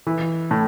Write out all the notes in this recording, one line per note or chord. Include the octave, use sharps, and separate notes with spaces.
E3
A2